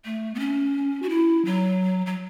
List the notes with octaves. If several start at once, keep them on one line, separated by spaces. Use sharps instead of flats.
A3
B3
C#4
F#4
E4
F#3
F#3